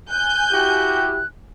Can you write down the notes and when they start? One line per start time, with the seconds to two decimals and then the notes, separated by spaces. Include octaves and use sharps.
0.10 G#5 F#6 G6
0.51 E4 F#4 G4